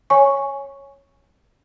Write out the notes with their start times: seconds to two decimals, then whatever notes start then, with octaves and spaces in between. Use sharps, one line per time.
0.10 C#5 G#5 C#6